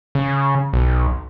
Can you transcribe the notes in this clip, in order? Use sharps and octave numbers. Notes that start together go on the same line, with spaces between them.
C#3
B1